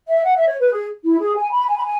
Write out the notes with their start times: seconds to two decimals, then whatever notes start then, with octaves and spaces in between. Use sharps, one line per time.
0.08 E5
0.24 F#5
0.36 E5
0.48 C#5
0.59 B4
0.72 G#4
1.04 E4
1.19 G#4
1.36 G#5
1.51 B5
1.67 G#5
1.76 B5
1.84 G#5